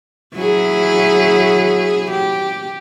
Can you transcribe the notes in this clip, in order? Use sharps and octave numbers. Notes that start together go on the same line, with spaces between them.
F#3 E4 G#4
G4